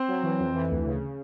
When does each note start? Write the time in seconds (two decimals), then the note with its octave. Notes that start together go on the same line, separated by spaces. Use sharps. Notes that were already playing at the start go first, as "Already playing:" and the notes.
Already playing: C4 C5
0.08 F#3
0.23 E3
0.40 F2
0.54 E3
0.70 D2
0.86 C#3